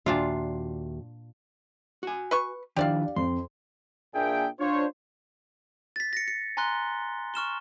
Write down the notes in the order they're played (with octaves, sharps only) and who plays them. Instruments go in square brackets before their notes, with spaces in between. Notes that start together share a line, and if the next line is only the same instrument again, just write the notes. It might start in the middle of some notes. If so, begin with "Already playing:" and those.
[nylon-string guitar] D#2 F#4 E5 [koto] A#2 D4 F4
[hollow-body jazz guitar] F#4 G#5
[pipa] B4 C#6
[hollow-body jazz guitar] D#3 F3 E4 [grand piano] D4 [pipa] G4 D5 F5
[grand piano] F2 [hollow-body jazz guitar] C6
[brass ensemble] A#2 A#3 D4 G#4 E5 G5
D4 F4 C5 C#5
[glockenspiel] A6 B6
A#6 C#7
C#7
G#5 A#5 C6 F#6 G7
C#6 F6 E7 G7